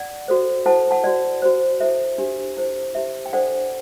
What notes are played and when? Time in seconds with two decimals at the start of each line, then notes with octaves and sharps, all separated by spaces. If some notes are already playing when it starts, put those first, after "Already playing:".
Already playing: D5 F#5
0.28 F#4 A4 C5
0.66 E4 A4 C5 F#5 A5
0.91 F#5 A5
1.04 F#4 C5 D5 F#5
1.42 F#4 C5
1.80 E4 A4 C5 E5
2.18 D4 G4 C5
2.57 E4 A4 C5
2.95 E4 G4 C5 E5
3.26 G5
3.33 D4 A4 C5 D5 F#5